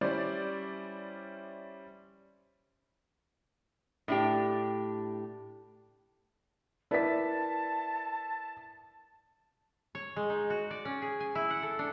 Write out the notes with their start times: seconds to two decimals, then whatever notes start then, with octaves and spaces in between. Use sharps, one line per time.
0.01 G3 C#4 E4 C5 D5
4.08 A2 D4 G4
6.91 E4 A#4 B4 D5 A5 B6
9.95 C#5
10.16 G#3
10.30 D#4
10.50 F#4
10.71 D5
10.85 C#4
11.02 G#4
11.20 G#5
11.35 E4
11.50 F#5
11.63 A4
11.79 D4